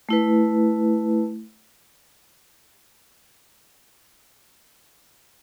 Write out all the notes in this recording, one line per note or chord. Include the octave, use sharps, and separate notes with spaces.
A3 E4 B4